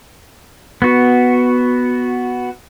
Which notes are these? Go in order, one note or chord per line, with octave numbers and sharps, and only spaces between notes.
B3 F#4